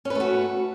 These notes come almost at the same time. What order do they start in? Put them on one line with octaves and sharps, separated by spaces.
C#4 B4 A3 F#4